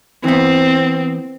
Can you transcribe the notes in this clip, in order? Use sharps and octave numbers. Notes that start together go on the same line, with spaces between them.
E3 B3 C4